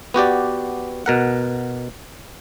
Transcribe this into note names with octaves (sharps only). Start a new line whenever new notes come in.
B3 F#4 G4 D5
B2 A#4 F#5